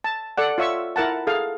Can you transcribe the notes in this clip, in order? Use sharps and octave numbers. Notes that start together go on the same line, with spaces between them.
A5
A4 D5 F#5
F4 C#5 E5 C#6 E6
E4 A#4 F#5 A5
G#4 A4 F5